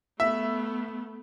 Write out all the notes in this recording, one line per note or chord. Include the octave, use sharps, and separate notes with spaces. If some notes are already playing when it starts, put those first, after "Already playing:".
A3 B3 E5